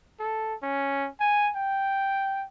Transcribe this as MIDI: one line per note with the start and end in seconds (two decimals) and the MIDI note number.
0.20 0.54 69
0.63 1.08 61
1.20 1.50 80
1.56 2.45 79